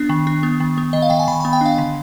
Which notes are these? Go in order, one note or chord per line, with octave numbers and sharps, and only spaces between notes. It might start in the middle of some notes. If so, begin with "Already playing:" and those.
Already playing: B3 D4
D#3
D4
B3
D#3
B3
D#3 D#5
F5
D#3 G5
G#5
D#3 B5
B5
B3
G5
D4 F5
D3